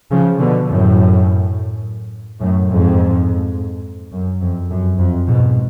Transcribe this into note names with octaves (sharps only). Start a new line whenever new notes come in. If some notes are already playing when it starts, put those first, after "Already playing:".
C#3 F3
B2 D3
F#2 A2
F#2 A2
F2 G#2
F#2
F2
F#2
F2
G#2 B2